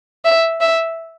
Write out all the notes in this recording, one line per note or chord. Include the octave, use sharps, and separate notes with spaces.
E5
E5